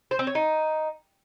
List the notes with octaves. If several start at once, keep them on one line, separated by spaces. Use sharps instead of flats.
C5
C4
C#5
D#4